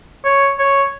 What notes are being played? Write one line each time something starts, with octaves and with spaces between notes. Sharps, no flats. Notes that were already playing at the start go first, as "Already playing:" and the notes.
C#5
C#5